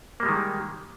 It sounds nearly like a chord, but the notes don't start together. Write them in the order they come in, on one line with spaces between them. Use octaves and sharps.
A#3 G3 G#3 D#3